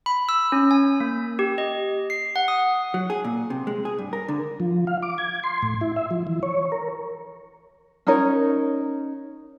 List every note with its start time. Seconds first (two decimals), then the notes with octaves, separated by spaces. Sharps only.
0.06 B5
0.29 E6
0.52 C#4
0.71 G#5
1.00 A#3
1.39 G4
1.58 D#5
2.10 C7
2.36 F#5
2.48 D#6
2.94 F#3
3.10 G#4
3.24 A#2
3.50 C3
3.67 G#3
3.85 G#4
3.98 G2
4.13 A#4
4.28 D3
4.60 F3
4.87 F5
5.03 D6
5.18 G#6
5.44 C6
5.62 A2
5.81 E4
5.96 E5
6.11 F3
6.27 E3
6.43 C#5
6.72 A#4
8.07 C#4 D#4 A#4 C#5